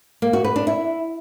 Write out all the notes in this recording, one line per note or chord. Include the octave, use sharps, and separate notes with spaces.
A#3
F#4
B4
D4
E4